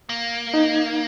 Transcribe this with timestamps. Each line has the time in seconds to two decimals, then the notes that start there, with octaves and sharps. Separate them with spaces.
0.09 A#3
0.54 D#4